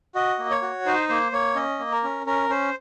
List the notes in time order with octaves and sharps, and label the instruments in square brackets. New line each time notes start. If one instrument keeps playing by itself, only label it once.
[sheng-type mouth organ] F#4 D#5
A#3
C#5
F#4
D#4 C5
A#3 C5
A#3 C#5
C#4 D#5
A#3
A#4
C#4
C#4 A#4
C#4 C5